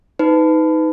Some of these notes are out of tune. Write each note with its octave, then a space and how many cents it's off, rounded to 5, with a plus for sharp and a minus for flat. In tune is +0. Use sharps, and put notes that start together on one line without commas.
D#4 +20 B4 +25